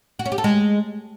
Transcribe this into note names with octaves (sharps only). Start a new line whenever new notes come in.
F#4
C#4
G4
A4
G#3